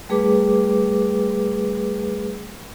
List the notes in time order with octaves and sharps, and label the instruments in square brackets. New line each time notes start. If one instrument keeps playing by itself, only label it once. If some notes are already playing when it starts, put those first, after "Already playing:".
[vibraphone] G3 A3 G#4 B4 D6